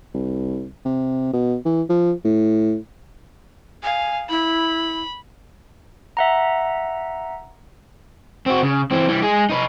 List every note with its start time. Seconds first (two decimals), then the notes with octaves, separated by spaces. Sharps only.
0.14 C2
0.85 C3
1.33 B2
1.65 E3
1.89 F3
2.25 A2
3.83 F5 G#5
4.30 E4 B5
6.17 E5 F#5 A#5
8.46 C4 F#4
8.62 C#3
8.91 E3 C4
9.08 E3 G3
9.22 G#3 G#4
9.49 D#4 B4